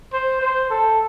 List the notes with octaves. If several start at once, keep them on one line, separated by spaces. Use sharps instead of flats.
C5
C5
A4